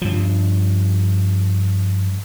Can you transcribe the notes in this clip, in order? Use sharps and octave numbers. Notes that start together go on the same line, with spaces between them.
G2 F3